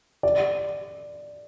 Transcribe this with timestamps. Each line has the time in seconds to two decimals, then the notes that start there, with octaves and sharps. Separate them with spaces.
0.23 D5